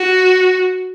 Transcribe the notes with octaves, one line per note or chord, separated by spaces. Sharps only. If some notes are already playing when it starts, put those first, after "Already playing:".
Already playing: F#4